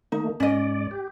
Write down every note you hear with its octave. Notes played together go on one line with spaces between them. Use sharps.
D#3 A3 A#3 D#4
G#2 C#4 D5 D#5
G4